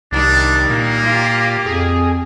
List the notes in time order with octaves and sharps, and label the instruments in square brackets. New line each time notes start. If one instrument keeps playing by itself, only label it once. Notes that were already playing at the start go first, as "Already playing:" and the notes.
[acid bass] C2 [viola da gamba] D#3 G3 [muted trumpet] D4
[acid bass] A#2 [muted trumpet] A#3
[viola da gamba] F4 G4
[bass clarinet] F2 [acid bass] G#4